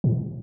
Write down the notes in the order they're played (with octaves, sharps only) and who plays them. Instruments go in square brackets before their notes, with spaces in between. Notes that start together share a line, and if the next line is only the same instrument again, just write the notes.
[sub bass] A2